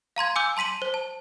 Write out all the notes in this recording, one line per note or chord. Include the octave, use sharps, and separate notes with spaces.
F5 A#5 C6 G#6
G#5 D6 E6 G6
A5 C6 B6 D#7 F#7
C5
A5